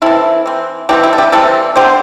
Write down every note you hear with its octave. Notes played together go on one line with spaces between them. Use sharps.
E3 C4 E4 A4
E3 C4
E3 G3 C4 D4 G4
E4
A4
D4 G4
C3 E3 G3 C4 E4 A4
D3 G3 C4 G4 C5